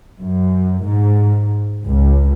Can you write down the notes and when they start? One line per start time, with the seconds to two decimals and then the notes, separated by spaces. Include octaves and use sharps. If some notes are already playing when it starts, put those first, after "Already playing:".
0.20 F#2
0.87 G#2
1.86 C#2